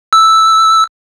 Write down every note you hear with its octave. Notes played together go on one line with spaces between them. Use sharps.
E6